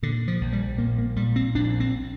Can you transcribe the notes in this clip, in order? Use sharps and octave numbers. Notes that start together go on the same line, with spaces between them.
A#2 D3
F3
A#1
G3
A#2 A#3
A#3
A#2 G3
C4
A#1 D4
C4